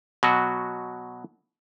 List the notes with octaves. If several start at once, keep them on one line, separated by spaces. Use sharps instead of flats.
B2 F#3 F#4